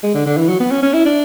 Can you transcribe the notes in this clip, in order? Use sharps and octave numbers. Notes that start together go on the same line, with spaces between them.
G#3
D3
D3
E3
F#3
B3
C#4
C#4
E4
D4